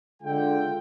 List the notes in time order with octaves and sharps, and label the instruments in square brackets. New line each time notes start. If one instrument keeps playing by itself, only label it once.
[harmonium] D3 [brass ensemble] G#3 F4 G5